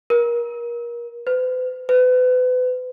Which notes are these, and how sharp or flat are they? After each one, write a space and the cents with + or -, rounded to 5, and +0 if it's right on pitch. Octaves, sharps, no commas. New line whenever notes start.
A#4 +30
B4 +45
B4 +35